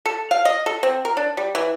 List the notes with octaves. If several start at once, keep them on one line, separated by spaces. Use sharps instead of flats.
A4
F5
D#5
A4
C4
A#4
D4
G3
E3